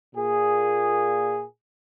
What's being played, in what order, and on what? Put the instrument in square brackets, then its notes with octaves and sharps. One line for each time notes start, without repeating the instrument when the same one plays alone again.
[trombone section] A#2 G#4